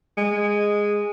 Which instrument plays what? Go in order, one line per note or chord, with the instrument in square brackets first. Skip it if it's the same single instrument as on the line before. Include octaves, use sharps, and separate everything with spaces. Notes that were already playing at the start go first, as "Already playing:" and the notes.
[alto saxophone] G#3